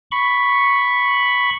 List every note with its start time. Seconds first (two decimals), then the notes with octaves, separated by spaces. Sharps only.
0.12 B5 C#6